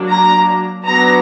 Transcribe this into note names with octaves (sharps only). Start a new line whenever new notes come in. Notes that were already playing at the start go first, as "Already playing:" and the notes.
Already playing: F#3 A#3 D4
A#5
F#3 B3 D4 A#5